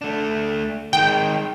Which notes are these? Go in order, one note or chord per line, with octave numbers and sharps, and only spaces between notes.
A3 D4
D#3 G#3 G5